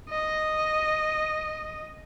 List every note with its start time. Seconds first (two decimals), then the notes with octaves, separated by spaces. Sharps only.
0.09 D#5